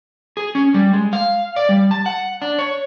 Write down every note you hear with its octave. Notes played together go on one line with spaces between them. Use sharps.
G#4
C#4
G3
G#3
F5
D5
G3
A5
F#5
D4
C#5